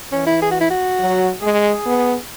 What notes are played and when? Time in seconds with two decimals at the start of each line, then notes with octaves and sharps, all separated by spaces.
0.12 E3 C#4
0.27 E4
0.42 G#4
0.51 F#4
0.61 E4
0.71 F#4
0.99 F#3
1.42 G#3 G#4
1.86 B3